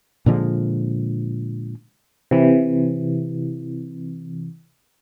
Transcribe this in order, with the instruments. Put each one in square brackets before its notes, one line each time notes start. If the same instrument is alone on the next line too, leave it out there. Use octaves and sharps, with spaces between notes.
[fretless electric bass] A#2 D3 F3 G#3
[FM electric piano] C3 E3